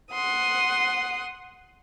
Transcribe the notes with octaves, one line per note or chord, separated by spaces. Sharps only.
F#5 C6 D#6